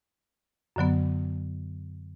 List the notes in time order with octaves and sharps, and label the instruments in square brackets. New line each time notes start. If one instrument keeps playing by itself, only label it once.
[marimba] F#2 D3 F#3 B3